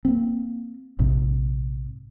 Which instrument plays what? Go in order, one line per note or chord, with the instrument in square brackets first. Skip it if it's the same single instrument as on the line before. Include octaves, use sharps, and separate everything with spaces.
[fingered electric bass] A#3 C4
A#1 G#2 C3